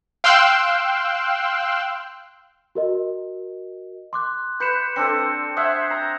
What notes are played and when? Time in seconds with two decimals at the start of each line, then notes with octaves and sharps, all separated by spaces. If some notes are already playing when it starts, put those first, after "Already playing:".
0.24 F5 G5 C6 E6 F#6
2.75 F#4 A#4 D#5
4.13 C6 D6 F#6
4.60 B4 G6 C#7 E7
4.96 C4 D4 A4 C#7
5.57 C5 E5 F#5 D#6 F#6 G#6
5.91 A#5